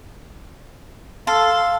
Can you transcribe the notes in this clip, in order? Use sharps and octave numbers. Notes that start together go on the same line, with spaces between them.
A4 F5 C6